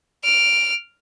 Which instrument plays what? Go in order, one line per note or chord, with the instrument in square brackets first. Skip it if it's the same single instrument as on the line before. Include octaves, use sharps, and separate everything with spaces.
[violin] F6 D7